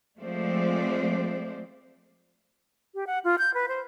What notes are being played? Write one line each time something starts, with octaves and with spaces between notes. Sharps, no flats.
F3 G#3 A3 C4 C5 D5
G4
F#5
F4
G6
B4
C5